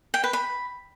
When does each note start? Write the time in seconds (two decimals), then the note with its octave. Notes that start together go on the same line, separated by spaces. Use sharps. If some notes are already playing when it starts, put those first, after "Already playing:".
0.14 G5
0.24 B4
0.33 B5